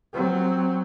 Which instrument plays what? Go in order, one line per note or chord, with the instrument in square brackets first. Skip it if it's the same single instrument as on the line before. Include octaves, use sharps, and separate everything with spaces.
[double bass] F#3 C4